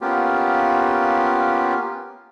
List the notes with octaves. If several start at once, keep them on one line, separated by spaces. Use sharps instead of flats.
A#3 B3 C#4 F4 G4